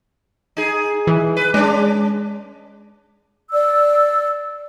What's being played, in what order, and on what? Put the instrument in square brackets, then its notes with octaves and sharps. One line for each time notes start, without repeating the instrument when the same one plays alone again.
[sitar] D#4 G#4
[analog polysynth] E3
[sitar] B4
[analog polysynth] G#3 [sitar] C#4 D4
[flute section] D5 E6